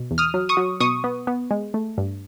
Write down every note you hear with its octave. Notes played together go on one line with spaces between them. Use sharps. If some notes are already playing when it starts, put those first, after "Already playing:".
Already playing: B2
E2
D#6 F6
F#3
C#6 D#6
F#3
B2 C#6 D#6
B3
B3
G#3
A3
G2